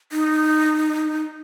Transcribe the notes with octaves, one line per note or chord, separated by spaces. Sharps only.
D#4